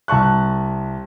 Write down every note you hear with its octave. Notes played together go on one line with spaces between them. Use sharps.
C2 A5 C#6 F#6